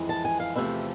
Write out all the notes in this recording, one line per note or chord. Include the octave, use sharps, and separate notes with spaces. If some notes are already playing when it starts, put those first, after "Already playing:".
Already playing: F2 E3 G#3
A5
G#5
F5
E2 C3 F3 A3 E5